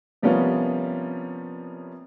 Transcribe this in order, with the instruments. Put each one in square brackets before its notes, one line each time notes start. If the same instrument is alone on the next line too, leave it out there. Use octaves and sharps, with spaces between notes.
[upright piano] C3 F3 G3 A#3 B3 C#4